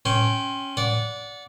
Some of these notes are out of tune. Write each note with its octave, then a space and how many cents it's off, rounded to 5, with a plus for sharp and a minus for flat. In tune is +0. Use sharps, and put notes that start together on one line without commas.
C#4 +0 G5 -10 C6 +20
D5 -25 F#5 -15